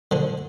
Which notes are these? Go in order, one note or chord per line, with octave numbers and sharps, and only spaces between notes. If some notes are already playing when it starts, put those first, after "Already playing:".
D3 F3